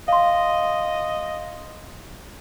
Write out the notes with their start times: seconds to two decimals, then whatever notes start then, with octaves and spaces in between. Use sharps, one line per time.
0.08 D#5 F5 C6